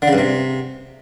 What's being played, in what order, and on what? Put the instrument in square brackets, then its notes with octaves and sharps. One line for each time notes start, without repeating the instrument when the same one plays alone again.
[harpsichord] D3
C#3
G2
C3